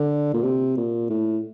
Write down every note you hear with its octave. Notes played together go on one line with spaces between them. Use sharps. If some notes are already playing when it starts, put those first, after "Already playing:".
Already playing: D3
A#2
C3
A#2
A2